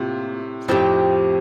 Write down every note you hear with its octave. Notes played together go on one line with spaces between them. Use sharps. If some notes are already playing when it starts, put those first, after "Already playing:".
Already playing: A2 C3 A#3 F4
F2 A2 F3 C4 G4